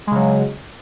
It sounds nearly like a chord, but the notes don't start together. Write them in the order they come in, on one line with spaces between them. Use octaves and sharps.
G#3 C#3 F#3